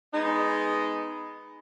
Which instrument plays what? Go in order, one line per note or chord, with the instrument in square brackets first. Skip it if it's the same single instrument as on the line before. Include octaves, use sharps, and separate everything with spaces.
[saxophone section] G#3 B3 D#4